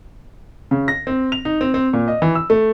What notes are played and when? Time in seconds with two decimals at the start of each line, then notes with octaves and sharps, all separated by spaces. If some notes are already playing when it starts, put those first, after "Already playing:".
0.71 C#3
0.88 A#6
1.07 C4
1.32 F7
1.45 D#4
1.61 C4
1.74 C4
1.93 A#2
2.08 D#5
2.22 E3
2.35 E6
2.50 A3